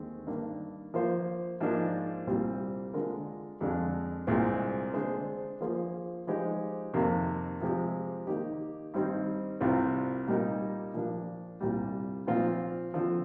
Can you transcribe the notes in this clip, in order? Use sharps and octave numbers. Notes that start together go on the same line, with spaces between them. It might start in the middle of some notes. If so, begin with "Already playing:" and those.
Already playing: D#2 D3 G#3 C4
G2 D#3 A#3 D4
F3 A#3 F4 C5
G#2 F3 A#3 D4
C2 A#2 G3 C4
D3 G#3 D4 F4 A#4
F2 D3 G#3 D4
C2 A#2 G#3 C4
D3 G#3 D4 G#4 C5
F3 A#3 F4 G#4 C5
F3 G#3 D#4 G4 C5
F2 C3 D#3 A#3
C3 F3 G#3 C4 G4
D#3 A#3 D#4 G4
G2 D#3 G3 C4 D#4
C2 C3 G3 C4 F4
A#2 G3 A#3 D#4 A#4
A#2 F3 A#3 D4
C2 A#2 G3
A#2 F3 C4 F4 C5
D3 F3 C4 F4